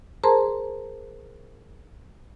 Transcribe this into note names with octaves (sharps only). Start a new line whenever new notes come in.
G#4 A#4 C5 A5 A#5 C6